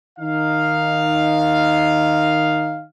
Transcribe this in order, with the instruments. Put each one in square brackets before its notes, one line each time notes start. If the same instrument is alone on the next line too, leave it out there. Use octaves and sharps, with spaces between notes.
[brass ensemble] D#3 D#4 F5